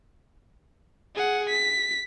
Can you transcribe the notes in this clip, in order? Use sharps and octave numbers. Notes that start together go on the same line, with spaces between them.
G#4 F#5
B6